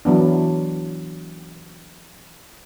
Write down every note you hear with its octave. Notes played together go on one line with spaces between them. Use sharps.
E3 F#3 B3 D4